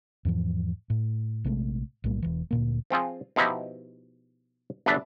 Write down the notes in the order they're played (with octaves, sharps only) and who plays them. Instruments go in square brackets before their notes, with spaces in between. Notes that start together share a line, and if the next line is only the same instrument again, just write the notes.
[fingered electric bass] E2 G#2 E3 F3
A2
A#1 C3 G#3 A3
B1 A2 G3 A#3
E1 E3
D2 A#2 A#3
[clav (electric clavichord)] F3 C4 F4 G#4
B2 F3 D#4 E4 G4
G1 E2 D4 B4 E5 A5